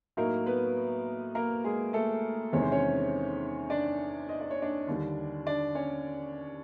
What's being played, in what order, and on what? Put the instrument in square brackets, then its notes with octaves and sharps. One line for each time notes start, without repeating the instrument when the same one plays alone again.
[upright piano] A2 F#3 A#3 D#4 A#4
B3 B4
A#3 A#4
G#3 G#4
A3 A4
E2 C3 D#3 G#3 C4 C#5
C5
C#4 C#5
D4 D5
D#5
D5
C#5
D4 D5
D#2 D3 G3
D4 D5
C#4 C#5